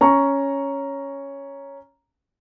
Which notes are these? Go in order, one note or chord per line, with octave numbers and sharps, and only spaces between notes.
C#4 A#5 C#6